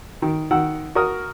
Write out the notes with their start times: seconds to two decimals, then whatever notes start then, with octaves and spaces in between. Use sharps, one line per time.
0.22 D#3
0.51 D#3 F#5 E6
0.95 F#4 A#4 D#6